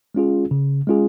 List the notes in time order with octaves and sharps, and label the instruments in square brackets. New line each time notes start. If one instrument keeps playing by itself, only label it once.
[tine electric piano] G#3 C#4 F4 G#4
C#3
G#3 C#4 F4 G#4